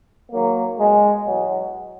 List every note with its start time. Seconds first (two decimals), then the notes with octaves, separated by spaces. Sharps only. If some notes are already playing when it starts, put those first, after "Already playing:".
0.31 G#2 D#3 F#3 A#3
0.78 C#2 B2 G#3
1.25 E2 B2 F#3